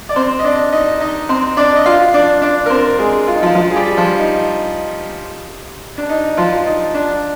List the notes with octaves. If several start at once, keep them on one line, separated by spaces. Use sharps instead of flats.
D5
C4 C5
D#5
D4 D5
D#4 D#5
D#4 D#5
C4 C5
D4 D5
D#5
F4 F5
D4 D5
D4 D5
A#4
C4 C5
G#3 G#4
F4
D#4
F3 F4
F3 F4
G#4
G3 G4
F3 F4
D#4
D4
D#4
F3 F4
D#4
D4